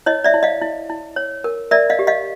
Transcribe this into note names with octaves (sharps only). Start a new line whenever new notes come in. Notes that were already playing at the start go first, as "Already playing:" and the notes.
E4 C#5 D#5
D5 E5
E4
D#5 F5
E4
E4
C#5
A#4
A#4 D5 E5
D#5 F5
G4
D#5 F5